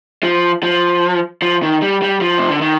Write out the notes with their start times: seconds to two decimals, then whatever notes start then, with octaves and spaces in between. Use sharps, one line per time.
0.23 F3
0.63 F3
1.42 F3
1.63 D#3
1.82 G3
2.02 G3
2.21 F3
2.38 C3
2.50 D3
2.61 D#3